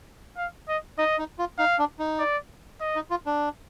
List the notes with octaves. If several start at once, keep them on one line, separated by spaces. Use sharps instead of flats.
F5
D#5
D#4 D#5
D#4
F4
D#4 F5
D4
D#4
D5
D#5
D#4
F4
D4